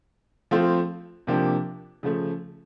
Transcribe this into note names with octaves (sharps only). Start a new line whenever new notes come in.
F3 A3 C4 F4
C3 F3 A#3 D4 G4
C#3 F3 A3